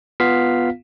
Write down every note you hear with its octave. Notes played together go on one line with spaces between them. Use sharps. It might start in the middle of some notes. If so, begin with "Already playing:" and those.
B3 F4 F5 B6